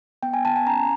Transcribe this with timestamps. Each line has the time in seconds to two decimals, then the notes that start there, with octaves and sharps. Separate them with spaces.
0.23 B3 G5
0.34 G#5
0.45 B3 A5
0.56 G#5
0.67 C#4 A#5